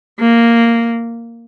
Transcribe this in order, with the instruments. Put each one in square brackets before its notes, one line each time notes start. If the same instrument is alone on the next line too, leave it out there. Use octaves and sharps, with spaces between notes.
[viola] A#3